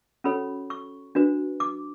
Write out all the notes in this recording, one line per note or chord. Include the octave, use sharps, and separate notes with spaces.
C#4 F#4 A4 C#5 B5
C#6
D4 F#4 B4
D6